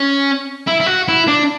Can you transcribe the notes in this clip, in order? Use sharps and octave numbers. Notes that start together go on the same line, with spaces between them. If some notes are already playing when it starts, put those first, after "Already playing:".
Already playing: C#4
E4
E4
F#4
E4
D4